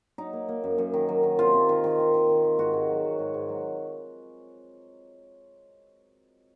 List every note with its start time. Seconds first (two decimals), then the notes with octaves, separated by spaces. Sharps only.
0.18 F#3 D#4
0.33 A#3
0.48 A#3
0.64 F#2
0.78 F#2
0.94 D#3
1.09 F#3
1.23 D#3
1.39 C3 F4
1.54 C3
1.69 D#3
1.84 D#3
1.99 D#3
2.14 D#3
2.29 D#3
2.44 D#3
2.59 G#2 F#4
2.73 G#2
2.89 F#3
3.04 F#3
3.19 G#2
3.34 G#2
3.49 F#3